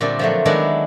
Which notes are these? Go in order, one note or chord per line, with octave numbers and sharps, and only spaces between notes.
A#2 D3 G3 A3 C4 D4
F3 F#3 A3
D#3 F#3 G#3 B3 D4 E4